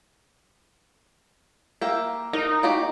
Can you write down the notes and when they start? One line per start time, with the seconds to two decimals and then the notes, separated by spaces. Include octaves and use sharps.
1.81 A#3 E5 G5
2.33 D#4 A#4
2.63 A#3 F#4 G4